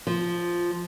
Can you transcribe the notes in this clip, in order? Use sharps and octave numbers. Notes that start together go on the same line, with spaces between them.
F3